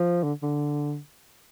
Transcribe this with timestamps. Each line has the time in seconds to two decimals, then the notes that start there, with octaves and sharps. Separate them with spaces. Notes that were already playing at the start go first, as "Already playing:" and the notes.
Already playing: F3
0.23 D3
0.43 D3